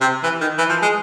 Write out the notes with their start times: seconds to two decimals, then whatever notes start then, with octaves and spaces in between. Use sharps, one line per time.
0.01 C3
0.23 E3
0.41 D#3
0.58 E3
0.69 F3
0.82 G#3